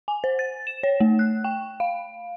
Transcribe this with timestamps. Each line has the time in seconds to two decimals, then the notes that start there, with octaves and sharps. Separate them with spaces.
0.08 G#5
0.24 C5
0.39 A6
0.67 E7
0.83 C#5
1.00 A3
1.19 F#6
1.44 G5
1.80 F5